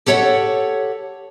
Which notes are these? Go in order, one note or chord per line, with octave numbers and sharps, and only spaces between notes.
G4 A4 C#5 F5 F#5